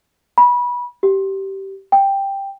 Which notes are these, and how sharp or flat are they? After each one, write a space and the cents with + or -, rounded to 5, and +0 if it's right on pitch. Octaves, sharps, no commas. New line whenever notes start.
B5 -20
G4 -20
G5 +5